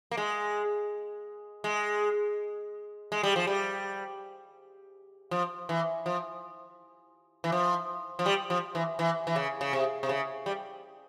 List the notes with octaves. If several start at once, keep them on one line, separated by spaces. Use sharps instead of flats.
A#3
G#3
G#3
G#3
G3
F3
G3
F3
E3
F3
E3
F3
F3
G3
F3
E3
E3
E3
C#3
C#3
C3
C3
C#3
G3